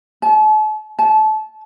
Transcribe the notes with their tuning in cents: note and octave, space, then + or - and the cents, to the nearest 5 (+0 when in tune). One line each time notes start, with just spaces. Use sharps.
A5 -40
A5 -25